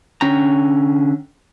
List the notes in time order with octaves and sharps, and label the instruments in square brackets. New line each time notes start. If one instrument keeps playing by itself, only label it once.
[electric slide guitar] D3 C#4 G5 A#5